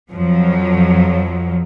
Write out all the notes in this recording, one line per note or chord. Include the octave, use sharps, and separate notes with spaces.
F2 F3 F#3